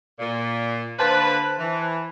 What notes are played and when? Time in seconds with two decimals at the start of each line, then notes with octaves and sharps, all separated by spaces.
0.19 A#2
0.99 D3 A#3 B4 C5 A5 F#6
1.59 E3